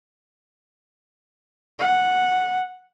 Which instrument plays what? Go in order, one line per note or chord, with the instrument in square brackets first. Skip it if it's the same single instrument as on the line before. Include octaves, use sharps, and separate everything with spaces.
[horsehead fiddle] F#5